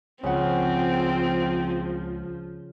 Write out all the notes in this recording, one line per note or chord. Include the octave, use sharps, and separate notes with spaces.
C#2 C#3 F3 C4 F#5